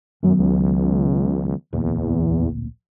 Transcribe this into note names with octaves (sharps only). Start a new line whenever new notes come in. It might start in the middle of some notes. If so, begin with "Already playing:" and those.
F#2 D#3 F#3 B3
C#2
D1 A#1 E2 A#3